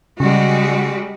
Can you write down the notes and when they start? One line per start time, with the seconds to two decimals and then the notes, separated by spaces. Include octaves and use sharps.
0.20 C#3 G3 G#3 F#4